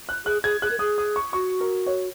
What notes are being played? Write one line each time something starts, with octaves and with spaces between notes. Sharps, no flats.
F#6
G#4 F#6
G#4 G#6
G#4 F#6
A#4
G#4 D#6
D#6
C#6
F#4 C#6
A#4
C#5